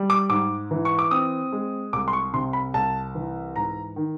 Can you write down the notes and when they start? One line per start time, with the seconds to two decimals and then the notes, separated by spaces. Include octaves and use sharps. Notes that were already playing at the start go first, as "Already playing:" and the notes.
Already playing: G3
0.10 D6
0.29 G#2 D6
0.71 E3
0.85 C#6
0.99 D6
1.11 C4 D#6
1.52 G#3
1.93 C2 D6
2.08 C6
2.13 C#6
2.33 C3 C6
2.53 B5
2.74 C2 A5
3.15 E3
3.55 G#2 A#5
3.96 D#3